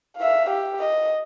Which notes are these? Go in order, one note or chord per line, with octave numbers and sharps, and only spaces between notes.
E5 F5
G4
D#5